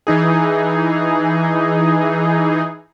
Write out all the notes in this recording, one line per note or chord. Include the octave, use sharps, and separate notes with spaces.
E3 D#4 G#4